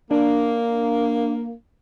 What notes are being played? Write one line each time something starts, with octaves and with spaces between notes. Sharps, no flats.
A#3 D4